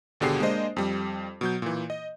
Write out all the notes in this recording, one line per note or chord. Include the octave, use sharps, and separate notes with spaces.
G#1 B2 D3 G4 G#4 C7
G#3 A#3 D4 C5 D#5
F2 G3
B2 F#3 G6
A#2 E3
D#5